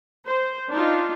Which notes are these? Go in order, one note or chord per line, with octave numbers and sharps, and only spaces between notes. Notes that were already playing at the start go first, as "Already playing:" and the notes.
C5
D4 D#4 F4